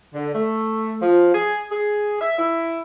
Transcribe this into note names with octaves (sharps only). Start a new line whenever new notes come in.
D3
A3
F3
G#4
G#4
E5
E4